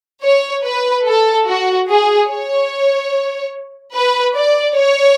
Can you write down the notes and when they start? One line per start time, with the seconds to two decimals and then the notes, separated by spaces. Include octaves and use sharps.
0.24 C#5
0.65 B4
1.06 A4
1.47 F#4
1.88 G#4
2.29 C#5
3.93 B4
4.35 D5
4.75 C#5